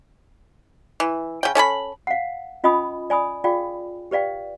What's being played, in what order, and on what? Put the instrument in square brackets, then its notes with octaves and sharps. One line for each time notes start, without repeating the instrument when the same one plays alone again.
[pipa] E3
C#3 G5
C#4 A4 G#5 B5
[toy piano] F5 F#5
C#4 F4 D#5 G#5 B5 D#6
D5 G#5 B5 D#6
F4 G#4 D5 F5 G5
G4 B4 D5 F5 G5